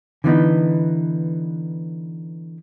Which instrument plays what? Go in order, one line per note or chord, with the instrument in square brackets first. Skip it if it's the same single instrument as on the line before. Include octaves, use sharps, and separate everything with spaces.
[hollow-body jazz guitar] D3 E3 B3 D#4